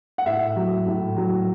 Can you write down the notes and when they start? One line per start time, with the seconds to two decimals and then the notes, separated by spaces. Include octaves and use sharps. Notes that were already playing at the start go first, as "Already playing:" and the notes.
0.18 F#5
0.26 A2 E5
0.56 F#3
0.87 A2
1.17 F#3